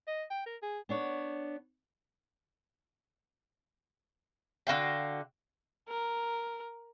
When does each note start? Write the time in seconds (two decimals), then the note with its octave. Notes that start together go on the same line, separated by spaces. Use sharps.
0.07 D#5
0.30 G5
0.46 A#4
0.62 G#4
0.89 B3 D4 C#5
4.67 D3 F#4 F5 G5
5.88 A#4